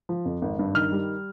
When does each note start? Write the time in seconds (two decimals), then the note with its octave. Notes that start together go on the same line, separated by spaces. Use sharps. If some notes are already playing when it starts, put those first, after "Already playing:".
0.09 F3
0.25 F2
0.42 G#1
0.59 G2
0.74 D#3 F6
0.92 G3